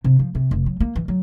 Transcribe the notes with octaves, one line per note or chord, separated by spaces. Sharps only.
C3
F3
C3
F1
F#3
A#3
E3
F#3